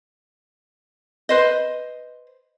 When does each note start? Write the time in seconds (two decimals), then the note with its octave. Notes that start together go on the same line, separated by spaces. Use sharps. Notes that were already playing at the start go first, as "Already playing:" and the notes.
1.29 B4 C5 D#5